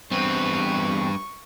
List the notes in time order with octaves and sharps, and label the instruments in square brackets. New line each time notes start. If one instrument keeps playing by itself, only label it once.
[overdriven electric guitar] E2 C4 [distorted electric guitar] G2 B4 [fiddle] C#6